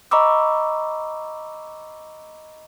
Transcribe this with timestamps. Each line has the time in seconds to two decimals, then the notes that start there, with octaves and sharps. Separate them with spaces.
0.11 D#5 A#5 B5 C#6 D6 E6